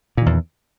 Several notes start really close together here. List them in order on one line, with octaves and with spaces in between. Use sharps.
A#2 D#3 E2